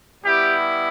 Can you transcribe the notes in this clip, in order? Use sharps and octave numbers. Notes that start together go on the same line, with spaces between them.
G3 B3 E4 G4